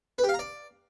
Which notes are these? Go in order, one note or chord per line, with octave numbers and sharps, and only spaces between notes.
B4
G4
F5
A#5
D5